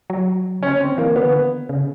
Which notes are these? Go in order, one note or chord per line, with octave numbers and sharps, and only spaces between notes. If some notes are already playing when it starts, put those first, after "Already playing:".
F#3
C#3 C#4
D3
C4
D#3
E3 A#3
D3 B3
C#3